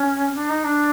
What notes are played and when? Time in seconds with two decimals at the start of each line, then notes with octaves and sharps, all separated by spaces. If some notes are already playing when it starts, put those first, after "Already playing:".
Already playing: C#4
0.34 D4
0.49 D#4
0.64 D4